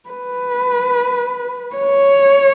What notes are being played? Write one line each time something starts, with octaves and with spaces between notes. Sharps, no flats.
B4
C#5